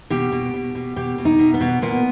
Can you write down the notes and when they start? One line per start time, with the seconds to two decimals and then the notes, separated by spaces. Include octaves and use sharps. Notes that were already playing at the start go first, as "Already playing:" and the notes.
0.10 B2 G4
0.32 B2
0.54 B2
0.75 B2
0.96 B2 G4
1.18 B2
1.25 D#4
1.39 B2
1.54 B3
1.61 B2
1.82 A#2 B3